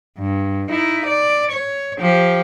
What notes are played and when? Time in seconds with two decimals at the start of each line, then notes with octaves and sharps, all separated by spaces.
0.18 G2
0.70 D#4 E4
1.06 D5
1.52 C#5
1.99 F3 G4